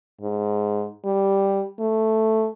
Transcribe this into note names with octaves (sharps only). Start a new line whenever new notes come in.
G#2
G3
A3